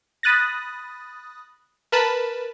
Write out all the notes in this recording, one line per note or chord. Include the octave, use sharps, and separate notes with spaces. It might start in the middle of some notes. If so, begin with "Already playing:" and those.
B5 D#6 F#6 A6 A#6
A#4 B4 A5 B5